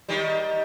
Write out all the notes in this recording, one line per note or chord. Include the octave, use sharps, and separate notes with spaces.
D#3 G3